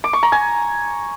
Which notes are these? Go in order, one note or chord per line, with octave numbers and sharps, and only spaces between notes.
D6
C#6
A#5
G#5